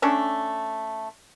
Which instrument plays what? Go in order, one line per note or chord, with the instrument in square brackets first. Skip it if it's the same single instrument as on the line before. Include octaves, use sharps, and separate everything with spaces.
[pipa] A3 C#4 D4